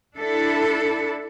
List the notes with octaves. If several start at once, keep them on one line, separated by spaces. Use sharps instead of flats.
D4 E4 A4